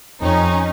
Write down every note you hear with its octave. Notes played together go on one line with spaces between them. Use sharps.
F2 C#4 D#4